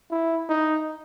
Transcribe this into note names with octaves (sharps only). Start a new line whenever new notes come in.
E4
D#4